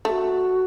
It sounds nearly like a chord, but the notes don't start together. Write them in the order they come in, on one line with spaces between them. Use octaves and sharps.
A3 A4 F#4